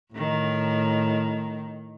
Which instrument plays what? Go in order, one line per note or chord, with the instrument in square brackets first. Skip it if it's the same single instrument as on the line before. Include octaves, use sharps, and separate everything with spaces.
[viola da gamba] A2 D#3